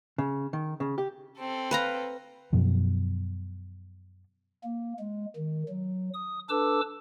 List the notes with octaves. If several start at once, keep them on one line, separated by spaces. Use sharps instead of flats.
C#3
D#3
C#3
G4
C4 A4
B4 F5 A#5
F#2 B2 F3
A#3
G#3
D#3
F#3
D#6
D4 A4 B4 A5 D6 E6